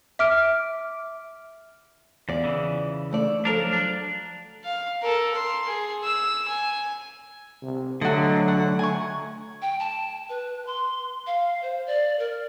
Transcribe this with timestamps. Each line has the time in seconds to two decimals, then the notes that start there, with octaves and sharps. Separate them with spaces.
0.19 E5 D6 F6 D7
2.29 E2 F4 D5
2.44 C#3 E3
3.11 D3 A3 D5
3.45 F3 F#3 D4 A4 A#4
3.73 D4
4.64 F5
5.02 A4 A#4
5.35 C6
5.67 G#4
6.04 E6
6.49 G#5
7.62 C3
8.01 D3 F#3 A3 F#4 D#5
8.48 F#5
8.79 G#5 C#6
9.62 G5
9.79 A5
10.29 B4
10.67 C6
11.27 F5
11.63 C5
11.87 D5
12.19 A#4